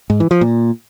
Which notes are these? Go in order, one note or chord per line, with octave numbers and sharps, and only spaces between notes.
G#2
E3
F3
A#2